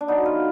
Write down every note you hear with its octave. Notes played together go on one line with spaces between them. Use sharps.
D4
D3 F#3 B3 D#4
F4